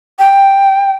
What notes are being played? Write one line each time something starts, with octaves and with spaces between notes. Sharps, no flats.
G5